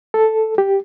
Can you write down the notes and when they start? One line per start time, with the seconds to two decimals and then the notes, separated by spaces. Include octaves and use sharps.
0.14 A4
0.58 G4